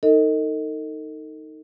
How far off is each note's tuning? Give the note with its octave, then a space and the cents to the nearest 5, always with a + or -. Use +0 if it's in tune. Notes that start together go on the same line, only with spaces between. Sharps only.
D#4 +5 A4 +40 D#5 +20